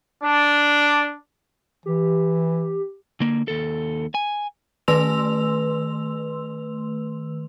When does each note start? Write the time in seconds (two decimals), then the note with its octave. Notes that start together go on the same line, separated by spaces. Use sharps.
0.23 D4
1.86 E3 G4
3.20 D3 A#3
3.48 D#2 A4
4.15 G#5
4.88 D#3 A3 B4 C6 E6 F7